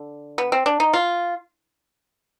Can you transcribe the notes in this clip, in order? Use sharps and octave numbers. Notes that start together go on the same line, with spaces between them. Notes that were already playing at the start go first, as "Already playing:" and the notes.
Already playing: D3
B3
C4
D4
D#4
F4